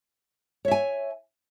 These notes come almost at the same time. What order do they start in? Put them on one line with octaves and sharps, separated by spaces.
C#5 E5 G#5